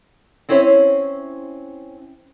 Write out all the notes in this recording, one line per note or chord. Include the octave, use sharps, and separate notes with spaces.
C4 C#4 E4 C5 C#5 E5